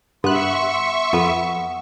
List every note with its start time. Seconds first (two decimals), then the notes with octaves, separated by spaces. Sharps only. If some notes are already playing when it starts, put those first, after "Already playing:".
0.24 G2 B3 E5 C6 C#6 F#6
1.13 F2 B3